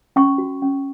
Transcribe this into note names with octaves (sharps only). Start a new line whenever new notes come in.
C#4 C#6
F#4
C#4